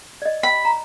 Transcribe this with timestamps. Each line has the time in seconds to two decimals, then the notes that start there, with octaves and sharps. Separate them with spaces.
0.22 D5 D#5
0.43 B5
0.65 A#5